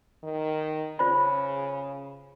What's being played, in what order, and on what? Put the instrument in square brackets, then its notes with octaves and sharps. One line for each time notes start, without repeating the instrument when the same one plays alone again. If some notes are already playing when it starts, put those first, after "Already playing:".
[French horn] D#3
[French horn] C#3 [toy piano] F4 C5 B5